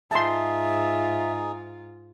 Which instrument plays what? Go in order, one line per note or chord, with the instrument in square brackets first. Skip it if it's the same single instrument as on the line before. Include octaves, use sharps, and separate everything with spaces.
[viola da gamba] G#2 F4 [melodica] D#4 G#4 [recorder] E5 [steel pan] A5 C6